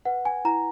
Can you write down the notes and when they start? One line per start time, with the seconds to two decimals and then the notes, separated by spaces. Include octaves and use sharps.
0.05 B4 F#5
0.25 G#5
0.45 E4 A#5